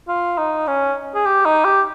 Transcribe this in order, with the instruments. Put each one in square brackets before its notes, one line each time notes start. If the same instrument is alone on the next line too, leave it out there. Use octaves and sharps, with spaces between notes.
[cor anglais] F4
D#4
C#4
G#4
G4
D#4
G4